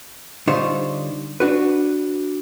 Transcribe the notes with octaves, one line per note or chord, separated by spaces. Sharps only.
D3 G3 D#4 F4 C5 C#5
D4 F#4 B4